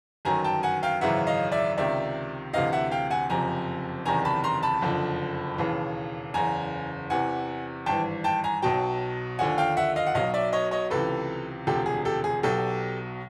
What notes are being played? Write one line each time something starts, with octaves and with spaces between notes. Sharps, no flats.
G1 F#2 D#3 F#3 G#5 A#5
G5 A5
F#5 G#5
F5 G5
G#1 F#2 C#3 E3 E5 F#5
D#5 F5
D5 E5
C#2 C3 D#3 D5 E5
D2 C3 E3 D#5 F5
E5 F#5
F5 G5
F#5 G#5
F#1 F2 C3 F3 G#5 A#5
F#1 E2 C3 D#3 G#5 A#5
A5 B5
A#5 C6
A5 B5
F#1 F2 D3 F3
E1 D#2 C#3 E3
F#1 E2 C#3 G#5 A#5
E2 C3 E3 F#5 G#5
G#1 G2 E3 G5 A5
G5 A5
G#5 A#5
B1 B2 F#3 G5 A5
D#2 D3 F3 F#5 G#5
F5 G5
E5 F#5
D#5 F5
F#5
B1 B2 F#3 D#5 F5
D5 E5
C#5 D#5
C#5 D#5
C#2 C3 E3 A4 B4
E1 D2 C3 F3 G4 A4
G#4
G4 A4
G#4
B1 B2 F#3 G4 A4